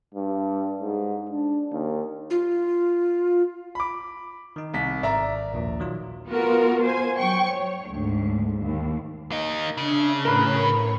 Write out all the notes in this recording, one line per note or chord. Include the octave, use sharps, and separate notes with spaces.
G2
G#2
D4
D#2
F4
B5 D6
D#3 D#4
C2 B6
G#1 A#4 D5 E5 A#5
A#1 D#2 A#2
D#3 F#3 F4
B3 F4 F#4 A#4
C5 G#5
F#3 G5 C#6
C#5
D2 G#2
D#2
A#3 D#4
C#3 D4 E5
A2 A#4 B4 C#5